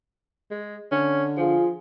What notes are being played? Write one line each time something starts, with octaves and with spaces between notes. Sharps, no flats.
G#3
D3 C#4
F3 F4 G#4